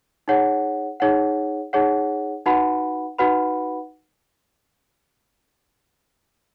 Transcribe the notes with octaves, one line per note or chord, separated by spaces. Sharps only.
D#4 G#4 C#5 F#5
D#4 G#4 C#5 F#5
D#4 G#4 C#5 F#5
D#4 F#4 B4 F#5 B5
D#4 F#4 B4 F#5 B5